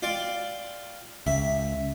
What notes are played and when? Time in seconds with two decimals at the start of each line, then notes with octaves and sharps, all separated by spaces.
0.02 F4 D5 G5
1.27 C#2 E5